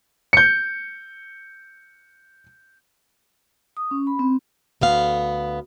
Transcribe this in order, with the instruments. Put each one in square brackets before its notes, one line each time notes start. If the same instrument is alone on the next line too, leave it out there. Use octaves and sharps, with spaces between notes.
[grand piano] G6 C#7
[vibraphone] D#6
C#4
B5
C4
[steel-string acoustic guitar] D2 B3 F5